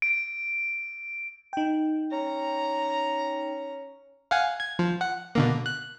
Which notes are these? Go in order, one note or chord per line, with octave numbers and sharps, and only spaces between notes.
D7
D#4 G5
C#4 A#5
F5 F#5 G#5
G#6
F3
F#5
B2 D3 A#3
F#6